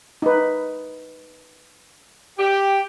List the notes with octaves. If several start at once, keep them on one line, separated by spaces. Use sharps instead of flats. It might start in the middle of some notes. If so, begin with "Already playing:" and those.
D#4 B4
G4